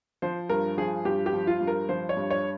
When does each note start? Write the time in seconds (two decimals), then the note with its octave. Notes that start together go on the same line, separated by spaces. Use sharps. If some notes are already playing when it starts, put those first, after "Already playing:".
0.22 F3 C5
0.49 G2 A#4
0.77 F3 G#4
1.05 G2 G4
1.26 G4
1.33 F3
1.47 F4
1.61 G2
1.67 A#4
1.89 F3 C5
2.09 C#5
2.17 G2
2.30 C#5